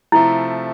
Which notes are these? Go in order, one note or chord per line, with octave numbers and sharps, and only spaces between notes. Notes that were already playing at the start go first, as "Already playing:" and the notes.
C3 F3 A3 E4